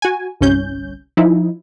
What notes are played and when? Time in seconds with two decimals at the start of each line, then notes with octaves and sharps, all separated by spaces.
0.02 F#4 G#5
0.41 G1 C2 C#4 G6
1.17 F3 D#4 E4